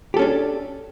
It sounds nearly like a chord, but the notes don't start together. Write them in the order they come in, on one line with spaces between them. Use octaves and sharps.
G4 A4 C#4 D4